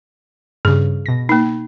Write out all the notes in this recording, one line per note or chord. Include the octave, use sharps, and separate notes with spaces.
G2 C#3 G#4
B2 A#6
A#3 D#4